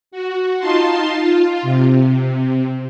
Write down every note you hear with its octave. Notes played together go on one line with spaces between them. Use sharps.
F#4
D#4 F4 A5 C6
F4
C3